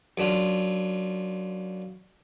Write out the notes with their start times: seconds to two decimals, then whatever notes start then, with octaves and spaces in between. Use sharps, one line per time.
0.18 F#2 D4 F4